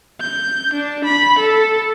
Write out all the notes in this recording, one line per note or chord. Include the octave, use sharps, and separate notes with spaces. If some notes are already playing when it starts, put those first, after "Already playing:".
G6
D4
B5
A4